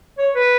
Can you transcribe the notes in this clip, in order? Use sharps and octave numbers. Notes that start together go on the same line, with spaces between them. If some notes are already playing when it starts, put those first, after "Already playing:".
C#5
B4